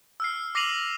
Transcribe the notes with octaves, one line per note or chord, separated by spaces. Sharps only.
E6 F6 C7
D6 A#6 C7 D#7 F7 F#7